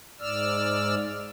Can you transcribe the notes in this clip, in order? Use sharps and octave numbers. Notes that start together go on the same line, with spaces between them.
G#2 D5 E6 F6